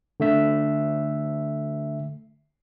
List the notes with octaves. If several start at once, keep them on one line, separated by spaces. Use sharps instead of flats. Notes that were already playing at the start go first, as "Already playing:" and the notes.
D3 A3 E5